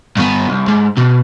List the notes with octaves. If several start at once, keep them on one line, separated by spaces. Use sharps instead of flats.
G2 B3
C2
G#2
B2